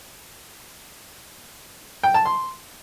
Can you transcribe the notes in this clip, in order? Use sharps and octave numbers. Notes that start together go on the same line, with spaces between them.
G5
A5
C6